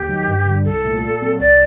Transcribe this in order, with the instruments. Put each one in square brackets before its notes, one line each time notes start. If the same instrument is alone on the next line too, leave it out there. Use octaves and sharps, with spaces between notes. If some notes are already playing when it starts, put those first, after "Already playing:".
Already playing: [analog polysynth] D#2 [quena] G4
[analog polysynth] D#3 F#3
G2
D3 G3
[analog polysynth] C2 [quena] A4
[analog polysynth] A#2 A3
A#2
F#3 C4
[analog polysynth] C2 [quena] D5